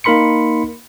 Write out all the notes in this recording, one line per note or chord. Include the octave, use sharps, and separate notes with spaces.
A#3 D#4 A#4 B5 C6 C#7